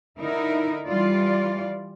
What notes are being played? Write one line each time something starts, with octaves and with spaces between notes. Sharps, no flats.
D3 D#4 E4 A#4
E3 G3 F4 D5